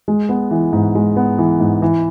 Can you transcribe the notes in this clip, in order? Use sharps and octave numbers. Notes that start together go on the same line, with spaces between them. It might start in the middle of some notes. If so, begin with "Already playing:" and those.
G#3
B3
E3
G#2
G#3
B3
E3
G#2
E3